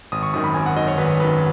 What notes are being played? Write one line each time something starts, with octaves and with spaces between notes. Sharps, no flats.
G#1 D#6
C#6
F#2 D#3 D#6
B5
G#1 G#5
F#5
F#2 D#3 D#5
C#5
G#1 B4
F#2 D#3 B4